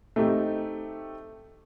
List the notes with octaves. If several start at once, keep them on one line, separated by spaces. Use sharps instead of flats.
A3 C4 D#4 G4